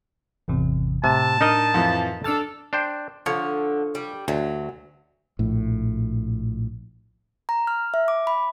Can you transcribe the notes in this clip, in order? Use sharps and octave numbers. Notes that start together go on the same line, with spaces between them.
G#1 E2 C3
A2 C3 A5
D4 D#4 A#4 D#5
F2 E3 F3
D4 A4 A5 D6 F6 A6
D4 C5 G5
D3 F3 C#5
G3
D2 F#3
A#1 A2
A#5
F6
E5
D6
B5